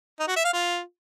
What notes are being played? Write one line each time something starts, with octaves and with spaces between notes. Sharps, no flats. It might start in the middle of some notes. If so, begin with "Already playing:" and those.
D#4
F#4
E5
F5
F4